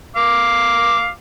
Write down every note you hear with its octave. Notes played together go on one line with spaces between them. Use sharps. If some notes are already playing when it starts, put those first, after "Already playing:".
F5 D6